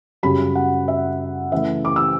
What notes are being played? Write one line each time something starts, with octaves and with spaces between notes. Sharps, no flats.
F#2 C#3 G3 B5
F#5
E5
C#3 E3 A3 E5
D6
E6